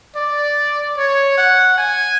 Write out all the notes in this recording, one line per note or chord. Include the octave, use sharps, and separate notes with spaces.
D5
C#5
F#5
G#5